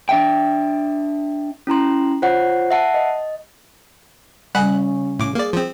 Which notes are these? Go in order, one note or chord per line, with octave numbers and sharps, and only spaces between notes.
D4 E5 G5
C#4 E4 A#5 C6
F4 C5 C#5 F#5
E5 F#5 A5
D#5
C#3 G3 F#5 G#5 B5 F#6
A2 D6
A#3 G#4 D5
F3 C4